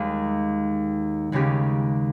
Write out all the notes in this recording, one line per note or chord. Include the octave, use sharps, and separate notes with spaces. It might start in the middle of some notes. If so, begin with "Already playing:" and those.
Already playing: D#2 D#3 G#3
D#2 C#3 G#3 C#4 G4